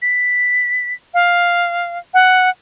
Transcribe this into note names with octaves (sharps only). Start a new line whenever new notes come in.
B6
F5
F#5